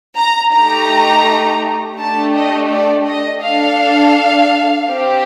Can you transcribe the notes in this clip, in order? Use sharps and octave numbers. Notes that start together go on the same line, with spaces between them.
A#5
A3 D#4 G4 A#5
A3 D4 G4 A5
D#5
D5
D#5
D4 A4 F5
C4 G4